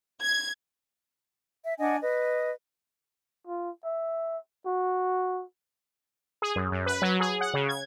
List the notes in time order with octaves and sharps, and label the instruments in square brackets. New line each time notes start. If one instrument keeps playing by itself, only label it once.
[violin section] G#6
[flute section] E5
D4 D#5 F#5 G#5
B4 D#5
[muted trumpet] F4
E5
F#4
[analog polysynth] G#4
F#2
F#2
B4
F#3
G#4
F#5
C#3
G#6